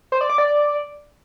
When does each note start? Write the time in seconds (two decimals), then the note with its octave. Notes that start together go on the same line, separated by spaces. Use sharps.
0.12 C5
0.21 D5
0.30 D6
0.38 D5